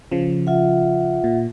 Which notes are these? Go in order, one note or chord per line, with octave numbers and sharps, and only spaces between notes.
C#3 F3
F4 E5 F#5
A#2